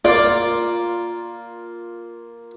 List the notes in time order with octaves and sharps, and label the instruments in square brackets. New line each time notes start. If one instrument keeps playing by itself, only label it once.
[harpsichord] A#3 F4 [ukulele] D5